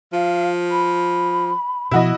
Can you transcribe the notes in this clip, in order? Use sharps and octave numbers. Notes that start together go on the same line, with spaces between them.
F3 F5
B5
B2 F3 E4 F#4 D#5